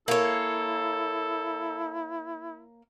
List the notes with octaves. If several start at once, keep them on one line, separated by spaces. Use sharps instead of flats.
A#3 E4 A4 A#4 C#5